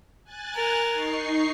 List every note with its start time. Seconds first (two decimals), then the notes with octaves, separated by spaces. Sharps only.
0.24 G#5 F#6 A6
0.55 A#4
0.92 D#4 C#6 C7